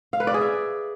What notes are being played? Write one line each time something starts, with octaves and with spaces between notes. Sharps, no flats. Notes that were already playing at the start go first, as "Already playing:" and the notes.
F5
B4
D5
G#4
E5